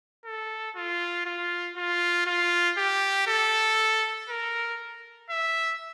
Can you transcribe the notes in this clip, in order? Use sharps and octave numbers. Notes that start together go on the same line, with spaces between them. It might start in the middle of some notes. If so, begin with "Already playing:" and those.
A4
F4
F4
F4
F4
G4
A4
A#4
E5